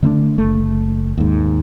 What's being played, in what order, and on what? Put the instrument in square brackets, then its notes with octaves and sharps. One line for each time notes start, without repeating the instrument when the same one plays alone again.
[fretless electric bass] D3 A3 A#3 D4
F#1 A3
D#2 G#2